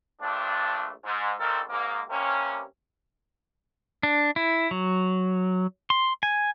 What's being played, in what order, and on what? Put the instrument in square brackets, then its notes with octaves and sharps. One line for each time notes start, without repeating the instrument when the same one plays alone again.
[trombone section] A#1 G2 F3 A3 D4
G#2
A#1 A#2 D#3 C4 A4 A#4
G#2 A#3
G2 C3 A#3 C#4
[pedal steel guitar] D4
E4
F#3
C6
G#5